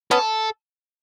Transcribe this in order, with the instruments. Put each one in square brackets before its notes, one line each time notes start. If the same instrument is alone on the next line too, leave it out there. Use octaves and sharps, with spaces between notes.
[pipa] B3 C#4 [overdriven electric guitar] A4